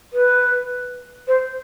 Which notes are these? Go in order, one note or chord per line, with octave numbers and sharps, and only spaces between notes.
B4
C5